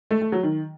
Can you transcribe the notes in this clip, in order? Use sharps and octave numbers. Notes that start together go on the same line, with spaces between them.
A3
A3
F#3
D#3